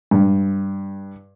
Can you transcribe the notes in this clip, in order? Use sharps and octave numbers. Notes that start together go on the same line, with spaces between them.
G2